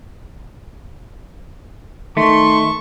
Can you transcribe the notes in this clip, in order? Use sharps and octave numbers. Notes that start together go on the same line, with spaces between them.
D#3 A3 A5 C6 C#6